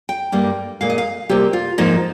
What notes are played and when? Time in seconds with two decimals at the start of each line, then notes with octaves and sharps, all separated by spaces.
0.09 G5
0.32 G2 G3 A#3
0.81 A#2 G#3 F5
0.90 D#5
0.98 F5
1.29 C3 G3 A#3 G4
1.53 F4
1.78 G#2 F3 A#3 D#4